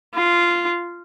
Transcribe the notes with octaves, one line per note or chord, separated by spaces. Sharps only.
F4